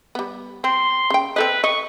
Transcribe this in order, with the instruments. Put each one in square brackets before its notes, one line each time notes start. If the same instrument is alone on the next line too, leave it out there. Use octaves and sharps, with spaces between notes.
[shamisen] G3 B3
[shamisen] C4 [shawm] C6
[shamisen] C#3 G5
[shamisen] C4 A4 D#5 [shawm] B4
[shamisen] D#5 [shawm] C#6